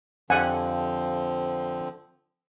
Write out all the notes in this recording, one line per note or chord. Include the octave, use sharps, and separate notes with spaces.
F2 D3 F3 C4 D4 G4 F#5 G#5